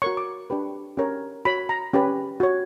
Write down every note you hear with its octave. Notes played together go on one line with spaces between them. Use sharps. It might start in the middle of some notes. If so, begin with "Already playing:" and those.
F#4 A#4 C#5 C#6
D6
D4 G4 B4
C#4 G4 A#4 C#5
F#4 C#5 B5
A#5
C#4 G4 B4
F#4 C#5